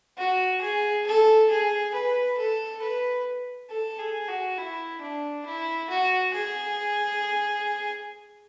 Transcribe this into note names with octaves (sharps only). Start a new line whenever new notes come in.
F#4
G#4
A4
G#4
B4
A4
B4
A4
G#4
F#4
E4
D4
E4
F#4
G#4